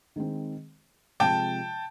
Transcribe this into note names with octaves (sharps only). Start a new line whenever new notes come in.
D#3 G#3 C4
C3 F3 G#3 G5 A5